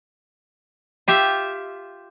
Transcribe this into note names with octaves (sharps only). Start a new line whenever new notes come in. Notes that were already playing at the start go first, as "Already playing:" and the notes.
F4 G4 E5